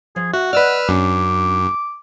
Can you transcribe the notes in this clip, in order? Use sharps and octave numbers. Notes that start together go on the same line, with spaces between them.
F3 G#4
F#4 E5 F#5
B4 D5 D#5 E6 F6
F#2 C#4 D4 D6